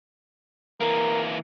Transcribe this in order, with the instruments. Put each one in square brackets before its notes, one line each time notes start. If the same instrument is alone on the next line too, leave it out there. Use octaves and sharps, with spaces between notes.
[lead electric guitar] E3 A#3 [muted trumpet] A#4